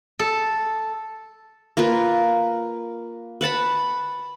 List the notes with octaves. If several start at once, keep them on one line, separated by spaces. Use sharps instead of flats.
A4
A#3 F4 A#4 B4
B4 F#5 A5 B5